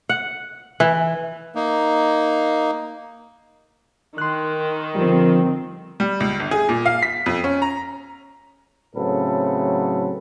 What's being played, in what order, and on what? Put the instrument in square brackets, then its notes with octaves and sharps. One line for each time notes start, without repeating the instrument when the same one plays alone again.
[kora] F#5
E3
[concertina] A#3 D#4
[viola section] D#3 [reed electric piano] C6 F#6
[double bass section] D3 C4 [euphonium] F3 [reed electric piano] G3
[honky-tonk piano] G3
C#2
G1
G#4
A#2
F5
B6
F2
C#4
A#5
[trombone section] A2 C#3 F#3 C4 A4 B4